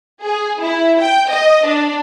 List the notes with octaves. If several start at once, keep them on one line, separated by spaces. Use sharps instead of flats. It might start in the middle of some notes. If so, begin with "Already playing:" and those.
G#4
E4
G5
D#5
D4